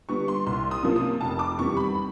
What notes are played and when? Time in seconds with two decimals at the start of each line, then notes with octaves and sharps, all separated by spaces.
0.09 D3 G3 B3 C#6
0.28 C6
0.46 C2 C6
0.71 D#6
0.83 C3 F3 A#3 C#4
0.96 D#6
1.21 F1 A5
1.39 D6
1.58 E2 C3 D#3 G3 C#6
1.77 B5
1.95 B5